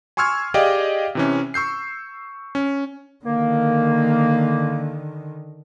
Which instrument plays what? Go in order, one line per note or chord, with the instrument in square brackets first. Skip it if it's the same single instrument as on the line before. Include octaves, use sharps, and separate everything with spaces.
[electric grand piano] G#5 C6 C#6 E6 F6 G#6
G4 G#4 D5 D#5 F5 G5
C3 E3 C#4
C#6 E6 G6 C7
C#4
[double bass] D3 D#3 [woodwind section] A#3